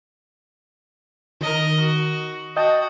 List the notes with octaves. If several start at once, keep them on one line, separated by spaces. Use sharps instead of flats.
D#3 A#4 D#5
F#4
F#4 D#5 G5 A5